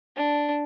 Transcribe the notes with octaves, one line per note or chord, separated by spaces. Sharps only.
D4